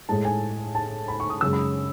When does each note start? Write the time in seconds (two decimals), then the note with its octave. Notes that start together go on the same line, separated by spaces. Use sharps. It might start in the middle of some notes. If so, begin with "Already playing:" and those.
0.09 A2 G#3 A5
0.25 G#5
0.75 A5
1.08 B5
1.20 C#6
1.30 D#6
1.41 F#2 C#3 G#3 E6
1.53 B5